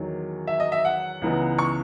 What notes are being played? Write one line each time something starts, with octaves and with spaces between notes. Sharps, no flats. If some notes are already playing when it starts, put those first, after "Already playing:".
Already playing: E2 D#3 F#3
E5
D#5
E5
F#5
C#2 C#3 E3 B3 D#4
C#6